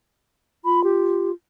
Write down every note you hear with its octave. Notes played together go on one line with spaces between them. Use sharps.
F4 B5
G4